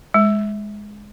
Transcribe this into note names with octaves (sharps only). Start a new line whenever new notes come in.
G#3